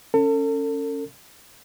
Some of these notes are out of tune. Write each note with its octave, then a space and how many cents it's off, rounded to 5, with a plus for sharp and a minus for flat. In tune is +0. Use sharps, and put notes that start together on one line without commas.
C#4 +0 A4 +40